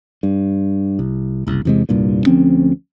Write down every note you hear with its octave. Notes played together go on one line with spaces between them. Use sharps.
G2
C2
F#1 C2
E2 C3 G#3
D#1 C2 G2 A#2
D2 F3 C4 C#4